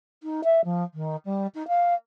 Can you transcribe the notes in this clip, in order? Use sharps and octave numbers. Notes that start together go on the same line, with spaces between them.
D#4
E5
F3
D#3
G3
D#4
F5